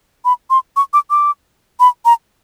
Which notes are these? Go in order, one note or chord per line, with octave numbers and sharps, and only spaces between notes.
B5
C6
C#6
D6
D6
B5
A#5